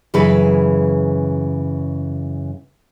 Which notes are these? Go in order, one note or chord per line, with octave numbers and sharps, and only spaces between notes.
F#2 C#3 E3 G#4 B4